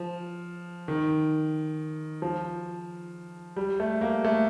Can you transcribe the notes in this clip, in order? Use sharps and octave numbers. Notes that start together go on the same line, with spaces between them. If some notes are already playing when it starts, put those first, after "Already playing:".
Already playing: F3
D#3
F3
G3
A3
A#3
A3